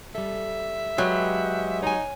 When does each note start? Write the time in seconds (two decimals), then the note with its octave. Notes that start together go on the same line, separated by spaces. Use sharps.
0.15 G3 A4 E5
0.98 F#3 G#3 G4 B4
1.82 D#4 C#5 G#5